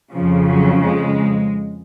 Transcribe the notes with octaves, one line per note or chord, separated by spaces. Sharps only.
F2 C#3 F3
F#3
G#3